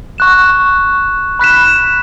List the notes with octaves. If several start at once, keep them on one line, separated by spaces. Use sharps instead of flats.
C#6 F#6 E7
B5 F#6 B6 E7